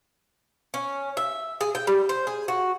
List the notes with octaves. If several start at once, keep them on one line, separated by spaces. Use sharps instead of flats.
C#4
E5
G#4
G5
G3
C5
G#4
F#4